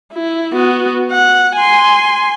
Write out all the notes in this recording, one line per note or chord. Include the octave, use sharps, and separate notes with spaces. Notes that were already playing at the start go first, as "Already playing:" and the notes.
E4
B3 F#4
F#5
G#5 C6